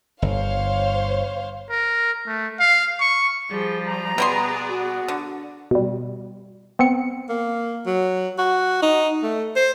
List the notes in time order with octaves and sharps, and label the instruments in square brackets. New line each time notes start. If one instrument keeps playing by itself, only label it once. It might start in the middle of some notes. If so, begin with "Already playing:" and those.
[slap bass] G1 [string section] C5 C#5 F5
[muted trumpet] A#4
A3
F5
C#6
[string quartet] F3 G3 [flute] G#4
[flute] A#5
[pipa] B2 G3 C6 [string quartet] B3 G#4 D5
[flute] F#4
[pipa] D3
[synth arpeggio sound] B2 G3
B3 C4 C#7
[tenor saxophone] A#3
F#3
F#4
D#4
A3
C5